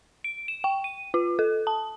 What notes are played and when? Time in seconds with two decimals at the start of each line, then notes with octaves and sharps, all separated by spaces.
0.24 D7
0.48 E7
0.64 G5
0.84 D#7
1.14 F4
1.39 A4
1.67 A5